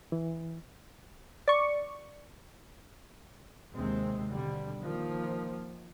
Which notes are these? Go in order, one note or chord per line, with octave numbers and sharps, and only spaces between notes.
E3
D5 C#6
D#2 C3 G#3 C4
B2 D3 G3
D#3 F3 A#3